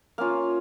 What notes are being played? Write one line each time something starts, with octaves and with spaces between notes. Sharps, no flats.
A#3 C#4 F4 F5